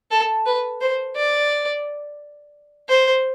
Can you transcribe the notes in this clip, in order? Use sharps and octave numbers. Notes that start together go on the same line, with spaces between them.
A4
B4
C5
D5
C5